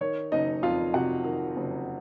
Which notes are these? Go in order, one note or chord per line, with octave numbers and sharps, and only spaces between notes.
D#3 C#5
F#1 D#4 D#5
F2 F4 F5
C3 F#4 F#5
D#3
F#1